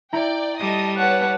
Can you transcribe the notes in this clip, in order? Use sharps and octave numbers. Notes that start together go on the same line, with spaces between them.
E4 D5 G5 A#5
G3 A4 D#5 D#6
B4 C#5 F#5 A5